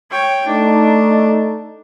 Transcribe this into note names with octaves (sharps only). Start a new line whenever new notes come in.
C#5 G5
A3 D4 D#4